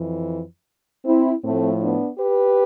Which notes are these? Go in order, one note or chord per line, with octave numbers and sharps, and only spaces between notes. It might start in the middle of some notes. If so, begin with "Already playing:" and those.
Already playing: F2 E3
C4 E4
A2 F3 A3 C4
B3 D4
G4 B4